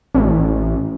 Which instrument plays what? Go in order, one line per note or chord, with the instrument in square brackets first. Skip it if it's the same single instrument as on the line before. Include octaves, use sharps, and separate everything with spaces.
[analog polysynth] A1